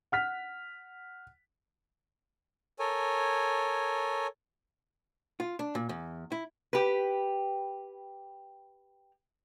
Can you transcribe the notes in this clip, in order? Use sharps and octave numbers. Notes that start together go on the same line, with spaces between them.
F#5 F6 B6
A4 A#4 C#5 G#5
F4
D4
A#2
E2
E4
G4 B4